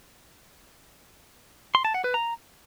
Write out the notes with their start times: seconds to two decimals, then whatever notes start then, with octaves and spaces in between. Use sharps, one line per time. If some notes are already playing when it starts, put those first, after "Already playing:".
1.75 C6
1.85 A5
1.94 F#5
2.04 B4
2.14 A#5